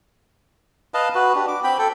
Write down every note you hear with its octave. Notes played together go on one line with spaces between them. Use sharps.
B4 D#5 F5 A5
F#4 B4
D4 G4
D6
C4 G5 B5
A4 G5